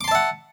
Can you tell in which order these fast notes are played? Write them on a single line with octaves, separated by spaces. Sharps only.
D6 C6 A5 E5 F#5